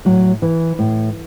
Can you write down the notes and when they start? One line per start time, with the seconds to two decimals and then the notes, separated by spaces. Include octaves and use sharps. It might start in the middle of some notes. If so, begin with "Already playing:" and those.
0.05 A2 F#3
0.42 E3
0.79 A2